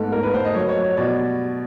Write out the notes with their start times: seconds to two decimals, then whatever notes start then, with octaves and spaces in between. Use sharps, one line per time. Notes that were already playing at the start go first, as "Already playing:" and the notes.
Already playing: G#2 A3 B3 A4
0.12 G#2 A#4
0.23 B4
0.33 A3 C5
0.45 D#5
0.54 F#3 C#5
0.69 C#5
0.76 F#3
0.82 C#5
0.97 B2 D5